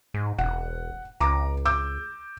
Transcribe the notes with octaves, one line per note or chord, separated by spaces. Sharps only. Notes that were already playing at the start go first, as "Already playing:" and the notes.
G#2
E1 F#5
C#2 A#5 D6
D6 E6 G6